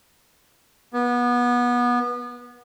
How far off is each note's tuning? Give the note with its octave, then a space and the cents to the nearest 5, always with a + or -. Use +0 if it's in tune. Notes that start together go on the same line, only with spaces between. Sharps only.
B3 -25